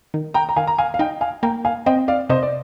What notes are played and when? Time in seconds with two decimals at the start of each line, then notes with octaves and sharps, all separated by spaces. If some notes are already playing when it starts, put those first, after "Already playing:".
0.14 D#3
0.34 G5 A#5
0.49 A#5
0.56 D#3 F5 G#5
0.67 A#5
0.78 F5 G#5
0.94 F5
0.99 D#4 D#5 G5
1.21 F5 G#5
1.43 A#3 G5 A#5
1.65 F5 G#5
1.86 C4 D#5 G5
2.08 D5 F5
2.30 C3 C5 D#5
2.43 D5